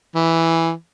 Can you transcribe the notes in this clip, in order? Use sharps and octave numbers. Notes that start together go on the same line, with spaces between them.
E3